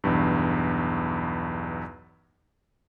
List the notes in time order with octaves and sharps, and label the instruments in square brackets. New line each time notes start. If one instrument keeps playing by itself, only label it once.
[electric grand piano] B1 E2 G2